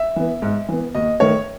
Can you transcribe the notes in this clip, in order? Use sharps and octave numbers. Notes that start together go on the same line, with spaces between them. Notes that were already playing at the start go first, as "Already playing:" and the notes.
Already playing: E5
E3 B3
G#2
E3 B3
D#2 D#5
D#3 A3 C#5